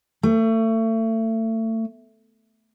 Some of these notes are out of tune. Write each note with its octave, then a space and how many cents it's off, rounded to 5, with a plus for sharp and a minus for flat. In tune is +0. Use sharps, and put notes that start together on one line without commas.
A3 +30